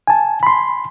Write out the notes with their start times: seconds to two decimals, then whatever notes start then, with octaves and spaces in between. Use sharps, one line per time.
0.07 G#5 A5
0.43 B5 C6